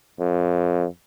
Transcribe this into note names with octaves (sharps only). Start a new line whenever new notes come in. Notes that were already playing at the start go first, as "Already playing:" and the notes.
F2